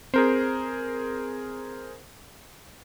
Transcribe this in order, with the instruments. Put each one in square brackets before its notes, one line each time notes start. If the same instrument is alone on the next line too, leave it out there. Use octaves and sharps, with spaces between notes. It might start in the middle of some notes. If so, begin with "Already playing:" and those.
[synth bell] C4 [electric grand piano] G#4 A#4 C5